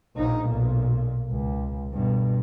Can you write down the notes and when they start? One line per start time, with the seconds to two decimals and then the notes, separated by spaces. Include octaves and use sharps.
0.16 A#1 D#4
0.48 B1 A#2
1.30 C#2
1.92 G2 B2